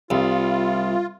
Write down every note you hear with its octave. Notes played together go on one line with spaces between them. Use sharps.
C2 F4